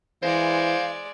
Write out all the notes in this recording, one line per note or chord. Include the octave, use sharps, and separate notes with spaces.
E3 G#3 C5 D5 F5